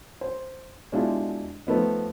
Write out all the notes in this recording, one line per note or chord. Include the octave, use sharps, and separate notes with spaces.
C5
B2 G#3 D4 E4 F4 G4
F3 A3 B3 D#4